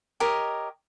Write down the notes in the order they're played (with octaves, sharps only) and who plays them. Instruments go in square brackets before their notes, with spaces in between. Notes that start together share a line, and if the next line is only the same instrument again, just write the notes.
[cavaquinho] G4 A#4 C#5 D#5